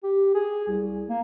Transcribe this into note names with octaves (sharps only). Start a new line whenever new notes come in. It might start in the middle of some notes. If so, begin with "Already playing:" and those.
G4
G#4
C2
A#3